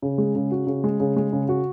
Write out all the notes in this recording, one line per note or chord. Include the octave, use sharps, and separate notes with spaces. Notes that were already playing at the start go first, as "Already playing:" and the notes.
C#3
G#3
C#3
F#4
C#3
G#3
C#3
G#3
C#3
F#4